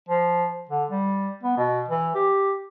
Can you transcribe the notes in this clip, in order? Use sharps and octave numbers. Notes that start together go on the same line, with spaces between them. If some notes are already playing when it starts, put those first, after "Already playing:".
F3
D3
G3
B3
B2
E3
G4